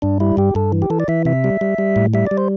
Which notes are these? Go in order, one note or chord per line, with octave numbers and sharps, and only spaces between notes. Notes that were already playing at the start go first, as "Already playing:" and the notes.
G2 D4
G3 E4
G2 G4
G2 A4
E3
G4
E3 A4
D5
E3 E5
C3 E5
G3
G3
G3
A2
G3 E5
G3 D5
C5